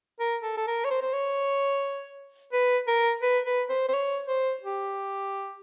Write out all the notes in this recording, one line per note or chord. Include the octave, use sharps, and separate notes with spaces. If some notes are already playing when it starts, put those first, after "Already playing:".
A#4
A4
A4
A#4
C#5
C5
C5
C#5
B4
A#4
B4
B4
C5
C5
C#5
C5
G4